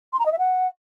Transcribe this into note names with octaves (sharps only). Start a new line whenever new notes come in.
C6
A#5
D#5
E5
F#5